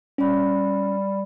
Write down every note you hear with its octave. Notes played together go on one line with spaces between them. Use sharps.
G3 C#4 D5 B5